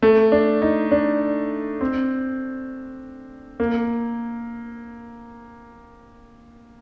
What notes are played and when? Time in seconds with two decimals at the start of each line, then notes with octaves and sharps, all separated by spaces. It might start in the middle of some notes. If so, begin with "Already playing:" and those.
0.02 A3
0.32 D4
0.62 D#4
0.92 D4
1.81 C4
3.60 A#3